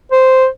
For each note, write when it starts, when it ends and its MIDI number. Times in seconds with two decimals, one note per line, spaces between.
0.12 0.47 72